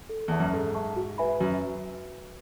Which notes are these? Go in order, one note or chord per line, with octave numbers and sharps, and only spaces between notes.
A4
E2 E5 A5 C#6
F#2
G#2 A4
E5 A5 C#6
F#4
B4 E5 G#5 B5
F#2 F#4